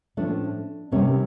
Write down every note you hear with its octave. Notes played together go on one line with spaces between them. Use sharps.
A2 F3 A3 C#4 D4
C3 D#3 G3 C#4